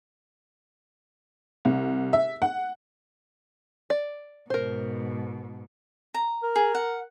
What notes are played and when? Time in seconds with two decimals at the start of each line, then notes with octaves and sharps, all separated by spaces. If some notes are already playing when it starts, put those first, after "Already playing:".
1.65 C2
2.13 E5
2.42 F#5
3.90 D5
4.50 G#2 B2 A#4 C5
6.14 A#5
6.43 A#4
6.56 G#4
6.75 F#5